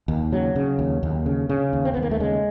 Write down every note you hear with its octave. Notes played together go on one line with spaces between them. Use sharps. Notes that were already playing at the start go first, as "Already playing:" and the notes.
D#2
C#3 F#3
C#3
D#2
D#2
C#3
C#3
D#2
C4
D#2 B3
A#3
A3
C#3 G#3